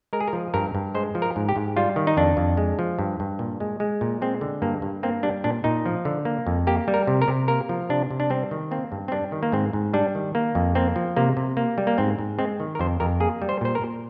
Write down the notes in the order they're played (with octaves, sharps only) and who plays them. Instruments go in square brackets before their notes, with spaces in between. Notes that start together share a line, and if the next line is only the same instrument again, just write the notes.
[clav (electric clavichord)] G#3 A#4
G#4
A#4
F3
G2 A#4
G2
G#3 C5
F3
A#4
G#2
G4
G#2
G3 F4
D#3
D#4
F2 D4
F2
G#3
F3
G2
G2
A#2
G#3
G#3
A#2
G#3 C4
D3
G2 A#3
G2
A#3 C4
G3 D4
A#2 D4
A#2 D#4
F3
D3
A#3
F2
A#3 G4
G3
A#4
C3
A#4
C3
A#3 A#4
F3
C3 D4
C3
D4
G3 C4
D#3
A#3 C4
G2
C4
G3 D4
D#3
A#3
G#2 C4
G#2
G3 D4
D#3
A#3
F2
A#3 C4
F3
C3 A#3
C3
A#3
G3
A#3
G#2 C4
G#2
G#3 C4
D#3
A#4
F2 C5
F2 A#4
A#3 G#4
G3
C5
A#2 C5
A#4
A#2